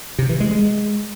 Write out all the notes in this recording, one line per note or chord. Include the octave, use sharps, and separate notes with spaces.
C3
E3
G#3
G#3